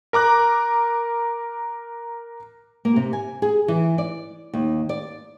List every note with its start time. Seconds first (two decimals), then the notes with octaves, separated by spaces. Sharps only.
0.13 A#4 A#5 D6 F#6
2.85 A#3
2.96 C3
3.13 G#5
3.42 G#4
3.68 E3
3.98 D5
4.54 D#2
4.89 D5